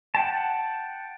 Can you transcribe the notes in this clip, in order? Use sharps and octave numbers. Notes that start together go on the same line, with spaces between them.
F#5 G5 A5